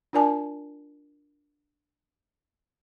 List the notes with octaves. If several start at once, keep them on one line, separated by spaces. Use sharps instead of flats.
D4 F4 A#4 D5 G#5 A5